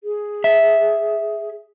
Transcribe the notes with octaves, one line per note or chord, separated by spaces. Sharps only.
G#4
E5